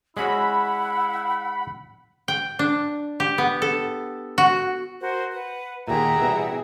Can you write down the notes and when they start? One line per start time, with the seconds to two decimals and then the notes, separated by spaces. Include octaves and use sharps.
0.17 G#3 C#4 E4 F#4 F#5 B5
2.28 G5
2.59 D4
3.20 G4
3.38 B3
3.62 A4
4.38 F#4
5.00 F#4 A#4 C5
5.32 B4 F#5
5.88 D#2 A#2 G4 G#4 E5 F#5 A#5
6.22 B2 E3 G3